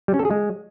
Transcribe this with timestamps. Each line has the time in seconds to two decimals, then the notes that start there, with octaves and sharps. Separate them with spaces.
0.08 G3
0.14 C#4
0.19 A4
0.25 G#4
0.31 G#3